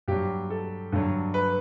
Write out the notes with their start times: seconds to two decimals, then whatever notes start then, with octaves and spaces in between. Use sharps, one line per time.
0.08 G2 F#3 G4
0.50 A4
0.92 G2 D3 F#3
1.34 B4